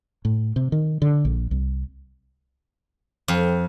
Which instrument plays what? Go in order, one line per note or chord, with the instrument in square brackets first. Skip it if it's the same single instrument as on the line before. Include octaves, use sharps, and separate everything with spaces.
[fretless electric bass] A2
C3
D#3
D3
A#1
C2
[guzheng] F2